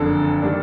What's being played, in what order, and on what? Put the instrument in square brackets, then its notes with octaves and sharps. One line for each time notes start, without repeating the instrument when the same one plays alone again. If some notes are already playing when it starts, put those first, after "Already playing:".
Already playing: [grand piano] F#1 F2 D3 A4
D#3 G3 A#3 D4